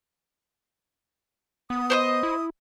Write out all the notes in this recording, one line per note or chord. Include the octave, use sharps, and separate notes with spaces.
B3 D#6
C5 C#5 D#5
E4